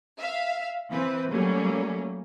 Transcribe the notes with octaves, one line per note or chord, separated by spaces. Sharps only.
E5 F5
E3 C4 B4
F#3 G3 A3 A#3 C#4